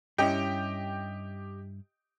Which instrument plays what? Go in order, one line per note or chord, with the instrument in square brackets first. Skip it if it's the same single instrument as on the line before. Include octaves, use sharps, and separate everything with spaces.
[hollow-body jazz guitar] G2 C#4 E4 [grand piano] G4 D#5 G5